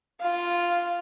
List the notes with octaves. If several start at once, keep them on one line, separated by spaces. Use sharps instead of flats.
F4 F5